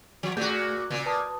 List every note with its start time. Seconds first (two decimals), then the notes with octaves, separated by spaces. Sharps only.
0.23 F3
0.37 A#2 A3 F#4 G#4 G6
0.91 A#2 C#3
1.06 B4 A5 D#6